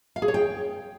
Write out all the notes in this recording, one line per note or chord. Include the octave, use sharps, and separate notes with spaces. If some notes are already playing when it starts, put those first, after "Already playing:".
F5
G#4
C#5
G5